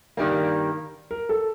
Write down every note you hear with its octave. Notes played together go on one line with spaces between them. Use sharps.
G2 D#3 G3 A#3 D5
A#4
A4